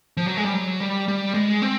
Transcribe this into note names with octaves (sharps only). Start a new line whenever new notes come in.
F3
F#3
G#3
G3
F#3
G3
G3
G#3
C4